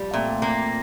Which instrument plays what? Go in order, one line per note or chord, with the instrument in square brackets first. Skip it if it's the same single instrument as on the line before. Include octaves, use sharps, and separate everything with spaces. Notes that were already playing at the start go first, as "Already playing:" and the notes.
Already playing: [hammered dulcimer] F3 [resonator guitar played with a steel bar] G3
[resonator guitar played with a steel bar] A#2 [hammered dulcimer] A3 C4
[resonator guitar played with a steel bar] A#3